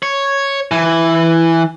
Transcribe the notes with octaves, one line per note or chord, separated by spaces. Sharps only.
C#5
E3